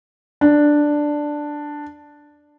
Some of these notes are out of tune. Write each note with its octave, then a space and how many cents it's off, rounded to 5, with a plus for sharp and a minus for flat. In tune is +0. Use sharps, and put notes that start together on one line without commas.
D4 +5